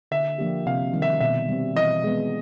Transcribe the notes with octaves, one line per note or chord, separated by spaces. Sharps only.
D3 E5
F3 A#3 D4 G4
C3 F5
D#3 G3
E5
B2 E5
G3 C4
E3 D#5
G#3 B3